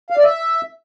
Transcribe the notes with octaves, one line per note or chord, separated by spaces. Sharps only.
F5
D5
E5